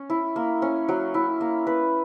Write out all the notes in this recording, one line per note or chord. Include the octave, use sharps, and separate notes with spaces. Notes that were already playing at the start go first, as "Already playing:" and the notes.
Already playing: C#4
E4
A#3
C#4
F#3
E4
A#3
B4